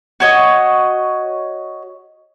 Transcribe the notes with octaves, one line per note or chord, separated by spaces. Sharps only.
F#4 C#5 D#5